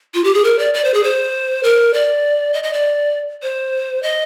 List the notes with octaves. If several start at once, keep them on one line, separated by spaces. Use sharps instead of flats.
F4
G4
G#4
A#4
D5
D5
C5
G#4
C5
A#4
D5
D#5
D#5
D5
C5
D#5